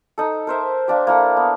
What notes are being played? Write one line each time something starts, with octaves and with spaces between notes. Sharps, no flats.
D#4 A4
A#4 C5 E5
A#3 D4 G4
A#3 E4 A4
B3